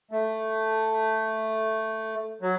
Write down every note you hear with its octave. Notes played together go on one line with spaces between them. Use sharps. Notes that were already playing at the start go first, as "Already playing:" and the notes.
A3
F#3